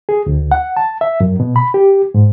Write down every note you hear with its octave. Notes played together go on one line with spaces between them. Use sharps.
G#4
D2
F#5
A5
E5
F#2
B2
B5
G4
G#2